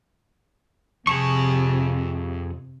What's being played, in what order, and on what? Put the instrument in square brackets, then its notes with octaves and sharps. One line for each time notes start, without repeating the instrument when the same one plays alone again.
[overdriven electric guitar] F2 A5 [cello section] C3 [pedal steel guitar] G#4 C#6